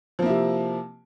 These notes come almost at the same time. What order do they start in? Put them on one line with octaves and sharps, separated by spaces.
F3 A#3 E4 C3